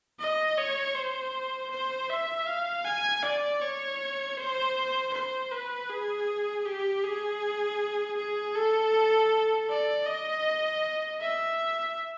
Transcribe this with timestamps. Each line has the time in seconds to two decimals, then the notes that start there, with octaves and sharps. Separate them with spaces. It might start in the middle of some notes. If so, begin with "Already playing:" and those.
0.19 D#5
0.58 C#5
0.95 C5
1.70 C5
2.10 E5
2.46 F5
2.85 G#5
3.22 D5
3.61 C#5
4.37 C5
5.14 C5
5.51 B4
5.89 G#4
6.65 G4
7.03 G#4
8.16 G#4
8.55 A4
9.69 D5
10.06 D#5
11.20 E5